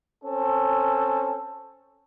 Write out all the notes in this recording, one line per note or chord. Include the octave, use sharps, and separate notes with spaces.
C4 C#4 A4